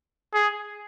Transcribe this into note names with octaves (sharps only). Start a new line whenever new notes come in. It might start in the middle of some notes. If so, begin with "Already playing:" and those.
G#4